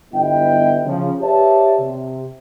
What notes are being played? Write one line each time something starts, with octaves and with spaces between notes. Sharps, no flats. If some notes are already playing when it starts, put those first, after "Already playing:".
G1 G3 B3 E4 D#5 G5
C#3 F3
G4 B4 C#5 D5 E5 A5
C3